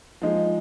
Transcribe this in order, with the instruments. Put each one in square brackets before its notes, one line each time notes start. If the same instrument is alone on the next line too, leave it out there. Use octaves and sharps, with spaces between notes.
[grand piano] F3 G#3 D#4